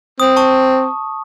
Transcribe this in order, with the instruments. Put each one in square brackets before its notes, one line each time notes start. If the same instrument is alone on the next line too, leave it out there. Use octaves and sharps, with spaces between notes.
[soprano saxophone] C4 [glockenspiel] D#6
[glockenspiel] A5 C#6 D#6